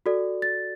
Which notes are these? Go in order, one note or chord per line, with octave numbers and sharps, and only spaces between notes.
F#4 A4 D5
A6